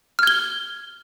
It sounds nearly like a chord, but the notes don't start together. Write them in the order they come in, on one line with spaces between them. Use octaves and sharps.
F6 G#6 G7